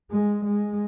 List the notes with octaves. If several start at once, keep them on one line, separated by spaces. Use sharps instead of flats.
G#3
G#3